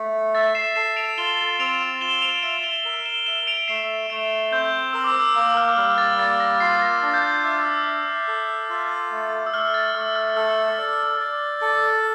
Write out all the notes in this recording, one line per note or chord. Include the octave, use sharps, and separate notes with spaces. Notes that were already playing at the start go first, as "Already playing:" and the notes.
Already playing: A3
E5 A6
C7 E7
A4 C7 E7
D7 F7
F4 E7 G7
C4 D7 F7
F4 E7 G7
D7 F7
E5 D7 F7
E7 G7
A#4
E7 G7
E5 E7 G7
D7 F7
A3 C7 E7
A3 D7 F7
C4 G6
A#4 E6
D6
E6
A#3 E6
F6
E6
G3 F6
A6
A#3 A6
A#6
F4 C7
A#6
D4 A#6
G6
A6
E5 D6
E6
E5
A4
F4
A3
E6
A3 F6
A6
A3 E6
F6
A4 E6
D5
D5
A4